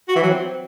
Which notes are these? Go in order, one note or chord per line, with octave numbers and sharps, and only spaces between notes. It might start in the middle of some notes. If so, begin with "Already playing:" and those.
F#4
E3
F#3
C4